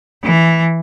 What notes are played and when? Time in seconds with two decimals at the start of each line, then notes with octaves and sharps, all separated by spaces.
0.23 E3